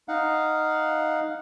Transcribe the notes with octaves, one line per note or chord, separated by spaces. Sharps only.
D#4 F5 F#5